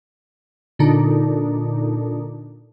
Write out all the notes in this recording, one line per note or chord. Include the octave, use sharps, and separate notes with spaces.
A#2 D3 D4 D#4